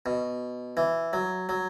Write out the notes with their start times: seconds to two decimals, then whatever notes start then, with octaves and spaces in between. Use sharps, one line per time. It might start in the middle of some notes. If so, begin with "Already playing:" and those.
0.06 B2
0.77 E3
1.13 F#3
1.49 F#3